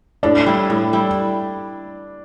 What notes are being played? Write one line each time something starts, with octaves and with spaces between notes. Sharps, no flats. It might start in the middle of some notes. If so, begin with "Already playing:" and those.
A2 D4
G3 E4
A2
G3 E4